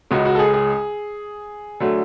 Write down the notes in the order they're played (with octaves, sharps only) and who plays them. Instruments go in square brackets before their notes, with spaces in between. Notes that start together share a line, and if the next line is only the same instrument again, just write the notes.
[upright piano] C#2 C#3 G#3 F#4
F#4
A4
G#4
G#4
D3 F#3 A3